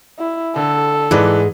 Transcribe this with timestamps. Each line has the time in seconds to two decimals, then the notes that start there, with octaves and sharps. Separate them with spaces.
0.19 E4
0.56 D3 A4
1.11 G#2 E3 G#3 B4 D5